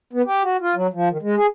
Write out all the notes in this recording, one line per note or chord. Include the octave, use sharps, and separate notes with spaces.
B3
G4
F#4
F4
F#3
F3
D#3
G#3
G#4